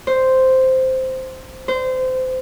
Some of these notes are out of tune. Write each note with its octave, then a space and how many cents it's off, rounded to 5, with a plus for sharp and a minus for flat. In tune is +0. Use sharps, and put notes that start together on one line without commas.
C5 -5
C5 -25